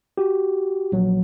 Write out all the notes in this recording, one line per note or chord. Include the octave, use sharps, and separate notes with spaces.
F#4 G4
A#1 F#3